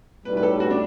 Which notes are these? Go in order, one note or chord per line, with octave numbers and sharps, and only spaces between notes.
B1 A2 G3 B4
B4
A4
F#4
D4